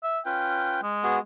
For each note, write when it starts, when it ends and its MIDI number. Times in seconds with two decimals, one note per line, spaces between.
0.04 0.19 76
0.26 0.81 61
0.26 0.81 65
0.26 0.81 71
0.26 0.80 79
0.83 1.19 56
1.03 1.19 59
1.03 1.19 66
1.03 1.19 68